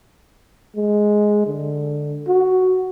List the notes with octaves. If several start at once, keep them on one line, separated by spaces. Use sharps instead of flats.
G#3
D3
F#4